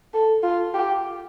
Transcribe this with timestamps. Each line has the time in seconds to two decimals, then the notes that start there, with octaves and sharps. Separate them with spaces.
0.14 A4
0.43 F4
0.74 G4